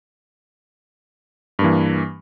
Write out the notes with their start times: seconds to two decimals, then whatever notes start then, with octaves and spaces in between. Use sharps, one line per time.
1.59 G2
1.62 A#3
1.64 E3